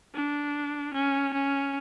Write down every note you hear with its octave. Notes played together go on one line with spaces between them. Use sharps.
D4
C#4
C#4